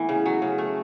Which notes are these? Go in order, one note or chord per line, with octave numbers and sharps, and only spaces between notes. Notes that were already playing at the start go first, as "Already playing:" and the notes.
Already playing: A2 E3 B3
C#3
F#3
C#3
A3